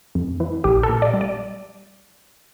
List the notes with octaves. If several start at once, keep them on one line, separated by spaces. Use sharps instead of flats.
F2
E3
A#1 G4
A4
A#2
D5
G3
D5